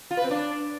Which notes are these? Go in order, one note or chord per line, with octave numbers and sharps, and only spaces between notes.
F4
B4
C4
D4